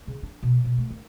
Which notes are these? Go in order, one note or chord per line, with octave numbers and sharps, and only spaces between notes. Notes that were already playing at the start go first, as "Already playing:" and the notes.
C#3
D4
B2
B2
A3
D#3